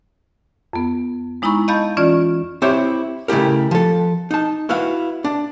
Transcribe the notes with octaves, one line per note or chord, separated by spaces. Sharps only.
F2 B3
G#3 D#4 E4 A#5 B5 C#6
D#5 F5 A5 B5 G6 A6
E3 C#4 F4 D5 F6
C4 E4 G4 C5 C#5 E5
C#3 A3 E4 G4 A#4
F3 A4
D#4 A5
E4 F#4 B4 F5
D4